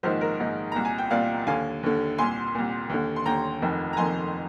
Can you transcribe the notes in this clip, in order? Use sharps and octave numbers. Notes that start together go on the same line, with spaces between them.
A#1 G#2 D#3 C5
A#4
A#1 G#2 D#3
C2 A#2 A#5
G#5
G5
C2 A#2 D5 F5
D#2 D3 F5 G#5
D#2 D3
C2 A#2 G#5 C6
C2 A#2
D#2 D3
C6
D#2 D3 G5 A#5
F1 F2 D#3
A#5
F1 F2 D#3 G#5 C6